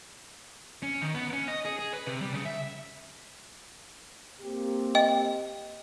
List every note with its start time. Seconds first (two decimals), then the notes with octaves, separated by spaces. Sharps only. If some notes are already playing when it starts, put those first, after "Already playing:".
0.83 C#4
1.02 D#3
1.14 B3
1.33 C#4
1.48 D#5
1.65 G#4
1.79 G#4
1.94 B4
2.07 C3
2.21 G3
2.33 C#3
2.45 E5
4.41 A#3 C4 G4
4.95 D#5 G5